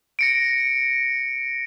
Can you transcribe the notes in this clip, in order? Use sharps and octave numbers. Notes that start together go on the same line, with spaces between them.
A#6 C#7 D7